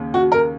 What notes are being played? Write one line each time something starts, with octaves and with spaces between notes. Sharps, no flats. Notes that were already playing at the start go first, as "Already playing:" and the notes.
Already playing: D#2 C#3
F#4
A#4